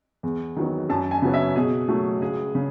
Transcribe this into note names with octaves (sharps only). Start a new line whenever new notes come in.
E2
D#3 F#3 B3
F#2 A5
G#5
C#3 F#3 B3
E5
B2 G#4
F#3 A3
C#2 G#4
C#3